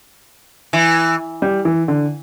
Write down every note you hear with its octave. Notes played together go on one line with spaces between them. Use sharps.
E3
G3
E3
D3